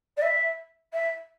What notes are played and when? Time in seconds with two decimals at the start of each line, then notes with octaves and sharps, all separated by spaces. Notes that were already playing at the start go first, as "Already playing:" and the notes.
0.17 D5
0.21 E5
0.92 E5